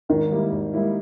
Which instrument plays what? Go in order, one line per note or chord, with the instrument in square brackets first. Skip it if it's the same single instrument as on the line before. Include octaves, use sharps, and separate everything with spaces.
[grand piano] G#1 [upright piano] D#3
[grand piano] G#2 G3 A#3 E4
G#1
G#2 G3 A#3 E4